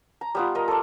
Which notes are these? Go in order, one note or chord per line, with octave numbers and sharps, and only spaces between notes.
A#5
G3 B3 F4
A#4 D#5
A4 D5